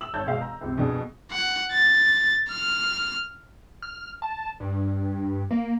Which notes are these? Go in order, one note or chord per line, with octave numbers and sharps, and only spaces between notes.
E6 F#7
G#1 C#5 A5 G6
B2 G#3 F5
A#5
C#2 C3
F2 B2 D4 G#4
F#5
A6
F6
F6
A5
G2
A#3